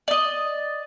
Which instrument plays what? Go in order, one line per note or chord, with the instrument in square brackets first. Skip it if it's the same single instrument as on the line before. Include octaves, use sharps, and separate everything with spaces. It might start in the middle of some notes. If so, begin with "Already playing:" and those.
[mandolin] D5 D#5